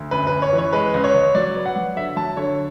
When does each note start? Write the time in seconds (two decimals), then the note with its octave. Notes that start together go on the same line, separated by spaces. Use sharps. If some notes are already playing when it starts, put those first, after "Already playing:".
Already playing: D2
0.11 F#2 B4
0.27 F#2 B4
0.42 C#5
0.53 E3
0.58 C#5
0.73 G#3 B4
0.94 C#2
1.04 C#5
1.15 C#2
1.35 F#3 D5
1.56 B3
1.66 F#5
1.76 F#3
1.96 D3 E5
2.16 F#3 A5
2.37 D3 C#5